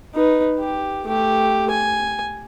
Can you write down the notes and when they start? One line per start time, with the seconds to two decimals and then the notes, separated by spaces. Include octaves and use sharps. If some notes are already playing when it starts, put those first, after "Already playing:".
0.14 D#4 B4
0.59 G4
1.06 A3 G4
1.71 G#5